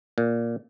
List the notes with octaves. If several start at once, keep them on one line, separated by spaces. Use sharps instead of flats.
A#2